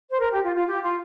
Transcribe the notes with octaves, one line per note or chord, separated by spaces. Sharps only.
C5
A#4
G4
F4
F4
G4
F4